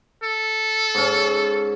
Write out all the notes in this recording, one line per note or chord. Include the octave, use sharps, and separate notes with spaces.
A4
G#2 C#4